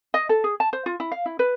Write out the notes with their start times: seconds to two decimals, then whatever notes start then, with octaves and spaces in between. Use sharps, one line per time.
0.14 D#5
0.29 A4
0.44 G#4
0.60 A5
0.73 C5
0.86 F4
1.00 E4
1.12 F5
1.26 E4
1.39 B4